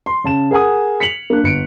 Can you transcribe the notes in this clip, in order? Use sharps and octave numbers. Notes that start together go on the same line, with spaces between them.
C6
C#3 A5 E7
G#4 A#4 F#5 G#5 D#6
B6 C#7 F7 F#7
A#3 D4 F#6
G1 C#7 D7